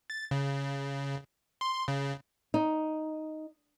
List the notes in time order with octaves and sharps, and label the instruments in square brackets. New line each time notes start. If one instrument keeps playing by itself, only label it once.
[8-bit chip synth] A6
C#3
C6
C#3
[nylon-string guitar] D#4